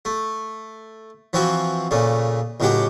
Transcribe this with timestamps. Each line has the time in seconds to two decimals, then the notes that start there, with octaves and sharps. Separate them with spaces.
0.05 A3
1.33 E3 F3 C4 F#4 G5
1.91 A#2 C#3 A3
2.60 C#2 A2 F#3 G4 F#5 G5